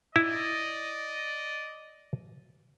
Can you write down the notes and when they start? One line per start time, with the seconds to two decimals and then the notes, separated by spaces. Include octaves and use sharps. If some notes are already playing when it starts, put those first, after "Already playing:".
0.16 E4 D5 D#5